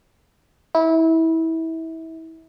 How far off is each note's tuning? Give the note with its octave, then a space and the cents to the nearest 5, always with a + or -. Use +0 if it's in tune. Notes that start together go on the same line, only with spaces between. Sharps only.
E4 -25